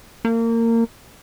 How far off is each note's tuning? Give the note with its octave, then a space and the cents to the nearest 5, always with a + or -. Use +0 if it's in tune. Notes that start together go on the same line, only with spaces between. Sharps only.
A#3 -25